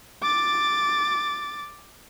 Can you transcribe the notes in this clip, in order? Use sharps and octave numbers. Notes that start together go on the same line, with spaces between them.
D6 A6